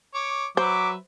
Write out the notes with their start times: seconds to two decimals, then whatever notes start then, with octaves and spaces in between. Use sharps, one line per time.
0.15 C#5 D6
0.57 F#3 B4 C5 E5 D6